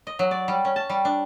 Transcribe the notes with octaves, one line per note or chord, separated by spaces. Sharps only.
D#5
F#3
D5
G3
C#4
A5
G3
D4